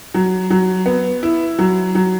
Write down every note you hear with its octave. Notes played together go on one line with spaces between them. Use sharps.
F#3
F#3
B3
E4
F#3
F#3